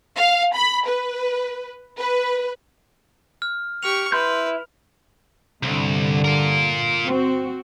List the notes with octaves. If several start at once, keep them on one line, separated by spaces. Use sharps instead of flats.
F5
B5
B4
B4
F6
G4 C#6 F6 F7
E4 B4 C6 G6
C2 G2 D3
F4 A#4
C4 F#4